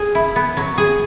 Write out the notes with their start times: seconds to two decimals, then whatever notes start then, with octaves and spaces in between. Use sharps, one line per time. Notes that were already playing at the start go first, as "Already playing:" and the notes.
Already playing: G#4
0.15 E4
0.36 B3
0.57 F#3
0.78 G#4